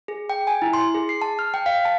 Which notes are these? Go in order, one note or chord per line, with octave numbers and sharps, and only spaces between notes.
G#4
G5
G#5
E4
C6
G#4
C7
A5
F6
G5
F5
A5